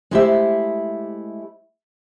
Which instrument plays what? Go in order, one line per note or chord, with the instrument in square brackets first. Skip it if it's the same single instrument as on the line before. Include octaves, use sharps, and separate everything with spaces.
[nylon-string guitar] G#3 A3 E4 G4 C5 E5